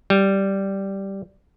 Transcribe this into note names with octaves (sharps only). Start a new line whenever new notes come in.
G3